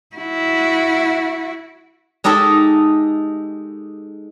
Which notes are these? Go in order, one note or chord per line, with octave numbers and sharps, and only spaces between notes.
E4 F#4
G#3 D#4 G4 A4 E5